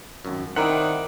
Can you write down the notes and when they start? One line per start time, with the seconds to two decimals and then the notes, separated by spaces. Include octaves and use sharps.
0.25 G#1 F#2
0.56 D#3 C4 D#4 E4 D5 F#5